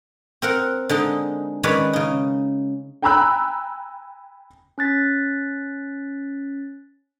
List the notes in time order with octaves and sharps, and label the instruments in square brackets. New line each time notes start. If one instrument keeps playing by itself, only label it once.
[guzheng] C4 A#4 F#5
D3 G#3 D#4
D#3 G#3 C#4 B4 C#5 D5
C#3 D#4
[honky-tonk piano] G5 G#5 A#5 B5 E6 F#6
[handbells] C#4 F#6 A6 B6